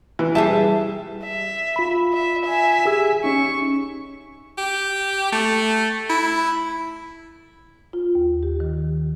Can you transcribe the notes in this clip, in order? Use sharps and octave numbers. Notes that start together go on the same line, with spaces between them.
E3
G3 G4 G#4 E5 A5
E5
F4 B5
E5
E5 G#5
G4 G#4 E6
C#4 D#4 C#6
G4
A3
E4
F4
D#2
G4
D#3